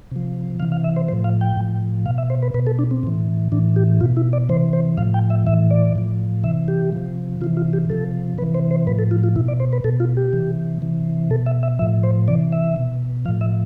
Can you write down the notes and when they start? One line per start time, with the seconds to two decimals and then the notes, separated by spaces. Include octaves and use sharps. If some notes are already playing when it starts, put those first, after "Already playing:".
0.11 C3 F3
0.60 C3 E3 F5
0.72 F5
0.84 E5
0.96 C5
1.09 A2 F3 C5
1.24 F5
1.41 G5
1.57 A2 F3
2.06 B2 F5
2.18 E5
2.30 C5
2.43 B4
2.54 B2 B4
2.67 A4
2.79 D4
2.91 C4
3.03 A2 E3
3.52 A2 E3 D4
3.76 G4
4.00 B2 F4
4.17 E4
4.33 D5
4.49 C3 E3 C5
4.73 C5
4.97 A2 F3 F5
5.14 G5
5.30 E5
5.47 A2 E3 E5
5.71 D5
5.95 A2 F3
6.44 C3 E3 E5
6.68 G4
6.92 C3 F3
7.41 C3 E3 F4
7.57 F4
7.73 G4
7.90 C3 F3 A4
8.38 C3 B4
8.42 E3
8.55 C5
8.71 C5
8.87 A2 F3 B4
8.99 A4
9.11 F4
9.23 F4
9.36 B2 E4
9.48 D5
9.60 C5
9.73 B4
9.84 B2 A4
10.00 F4
10.17 G4
10.33 C3 E3
10.82 C3 E3
11.30 B2 A4
11.46 E5
11.63 E5
11.79 A2 F3 E5
12.03 C5
12.28 C3 E3 D5
12.52 E5
12.76 B2
13.25 F3 F5
13.29 A2
13.41 E5